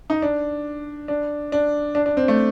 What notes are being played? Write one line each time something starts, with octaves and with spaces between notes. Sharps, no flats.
D#4
D4
D4
D4
D4
D4
C4
A3